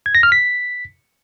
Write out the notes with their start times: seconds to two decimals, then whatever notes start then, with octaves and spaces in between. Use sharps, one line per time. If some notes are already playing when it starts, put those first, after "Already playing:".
0.06 G#6
0.15 A#6
0.23 F6
0.32 B6